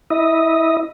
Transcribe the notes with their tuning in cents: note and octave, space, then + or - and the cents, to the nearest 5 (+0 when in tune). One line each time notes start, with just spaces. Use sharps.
E4 -20 D#5 +0